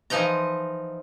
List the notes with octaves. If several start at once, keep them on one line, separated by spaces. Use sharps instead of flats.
E3 F3 D#4 D#5 A#5